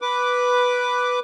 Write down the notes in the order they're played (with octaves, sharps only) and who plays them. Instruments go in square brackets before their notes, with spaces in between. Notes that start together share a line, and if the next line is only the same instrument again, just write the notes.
[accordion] B4 D6